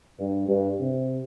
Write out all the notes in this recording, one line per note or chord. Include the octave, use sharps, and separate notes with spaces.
G2
G2
C3